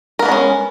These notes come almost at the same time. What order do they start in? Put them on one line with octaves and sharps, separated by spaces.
A#4 B3 A#3 G#3 C#4